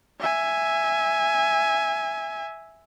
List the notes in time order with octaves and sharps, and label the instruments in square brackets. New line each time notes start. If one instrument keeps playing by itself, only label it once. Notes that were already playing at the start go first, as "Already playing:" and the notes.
[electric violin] E5 G#5